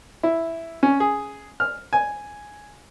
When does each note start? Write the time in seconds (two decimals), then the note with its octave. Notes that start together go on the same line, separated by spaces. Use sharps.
0.23 E4
0.83 C#4
1.00 G#4
1.60 F6
1.93 G#5